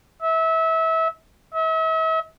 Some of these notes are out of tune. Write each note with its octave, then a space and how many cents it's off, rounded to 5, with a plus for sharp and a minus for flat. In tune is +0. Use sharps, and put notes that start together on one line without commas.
E5 -25
E5 -40